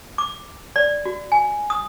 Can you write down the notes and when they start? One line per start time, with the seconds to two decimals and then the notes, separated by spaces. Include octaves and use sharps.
0.18 D6
0.76 D5
1.05 F#4
1.32 G#5
1.70 D#6